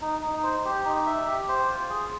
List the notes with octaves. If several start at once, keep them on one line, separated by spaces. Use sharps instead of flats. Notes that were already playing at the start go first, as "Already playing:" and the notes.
D#4
D#4
C5
G4
D#4
E5
G4
C5
F4
G#4